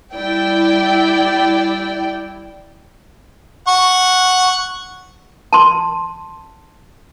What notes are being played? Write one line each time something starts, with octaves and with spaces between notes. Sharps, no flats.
G3 E4 D5 G5
F#5 C#6
A5 C6